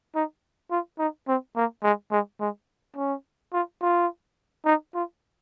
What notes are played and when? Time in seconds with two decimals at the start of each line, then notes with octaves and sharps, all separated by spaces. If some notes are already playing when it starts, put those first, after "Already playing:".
0.15 D#4
0.71 F4
0.99 D#4
1.28 C4
1.56 A#3
1.83 G#3
2.11 G#3
2.40 G#3
2.97 C#4
3.53 F4
3.81 F4
4.66 D#4
4.95 F4